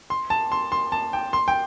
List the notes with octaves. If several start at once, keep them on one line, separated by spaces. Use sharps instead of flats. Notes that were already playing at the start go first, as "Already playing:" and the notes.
C6
A5
C6
C6
A5
G5
C6
G5